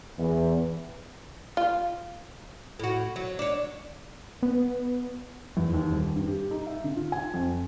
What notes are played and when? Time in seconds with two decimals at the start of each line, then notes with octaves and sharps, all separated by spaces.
0.18 E2
1.57 F4
2.79 A2 F#4
3.16 F#3
3.39 D4 C#5
4.43 B3
5.57 E2
5.74 D#2
5.91 D#1
6.16 G2
6.27 G4
6.51 D#4
6.67 E5
6.84 D3
6.96 F4
7.12 G#5
7.34 F2